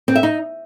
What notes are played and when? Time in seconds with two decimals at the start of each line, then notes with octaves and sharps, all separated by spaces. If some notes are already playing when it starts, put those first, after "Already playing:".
0.08 C4
0.16 E5
0.23 D#4